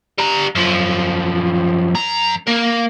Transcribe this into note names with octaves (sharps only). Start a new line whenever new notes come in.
G3 A#5
F#2 F3
F#2 A#5
A#3 A#4